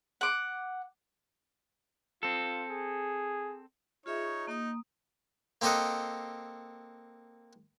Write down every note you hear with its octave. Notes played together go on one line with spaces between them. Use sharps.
F#5 D6
C4 F4 A4
G#4
D#4 F4 G#4 C#5 E5
A#3 D#4 D#6
A#3 C4 G4 A4 D#5 F#5